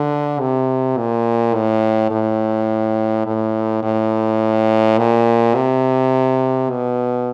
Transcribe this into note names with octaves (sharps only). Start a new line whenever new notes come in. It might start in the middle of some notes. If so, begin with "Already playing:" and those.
Already playing: D3
C3
A#2
A2
A2
A2
A2
A#2
C3
B2